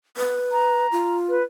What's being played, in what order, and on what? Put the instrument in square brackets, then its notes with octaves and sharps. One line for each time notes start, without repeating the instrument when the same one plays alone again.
[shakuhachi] B4
[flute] A#5
[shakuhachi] F4
[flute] B4